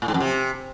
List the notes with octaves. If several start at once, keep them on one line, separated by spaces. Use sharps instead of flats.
A2
G#2
F2
C3